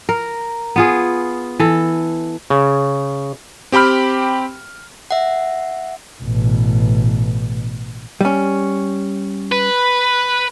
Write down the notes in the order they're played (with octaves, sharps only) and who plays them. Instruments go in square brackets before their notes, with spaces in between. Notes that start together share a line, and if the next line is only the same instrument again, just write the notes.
[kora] A#4
B3 F4 G#4
E3 A4
[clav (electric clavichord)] C#3
[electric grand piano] C4 G4 G5 B5 F6
[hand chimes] E5 F#5
[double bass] A1 B2
[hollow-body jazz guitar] G3 C#4
[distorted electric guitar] B4